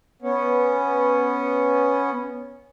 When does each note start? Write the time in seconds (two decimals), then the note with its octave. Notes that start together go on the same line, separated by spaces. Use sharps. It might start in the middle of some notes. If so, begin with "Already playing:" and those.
0.22 B3 C#4